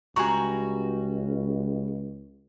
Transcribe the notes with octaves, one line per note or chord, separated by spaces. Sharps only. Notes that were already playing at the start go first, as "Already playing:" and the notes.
C#2 G3 F#4 G#4 A#5 C#6